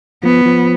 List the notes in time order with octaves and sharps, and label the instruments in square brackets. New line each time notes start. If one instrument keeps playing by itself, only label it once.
[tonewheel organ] F3 [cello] B3
[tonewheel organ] F3